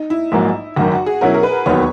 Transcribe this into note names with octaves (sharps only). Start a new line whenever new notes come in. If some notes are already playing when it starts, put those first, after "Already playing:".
Already playing: D#4
E4
A#1 G#2 F#3 A#3
G#1 F#2 D#3 F#4
F#4
G#4
B2 F#3 C#4 E4 A#4
A#4
B4
E1 D#2 D#3 F#3 B3 C#5